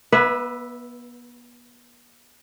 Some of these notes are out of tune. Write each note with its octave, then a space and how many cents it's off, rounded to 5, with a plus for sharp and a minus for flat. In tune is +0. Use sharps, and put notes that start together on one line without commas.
B3 -35 B4 +0 E5 +0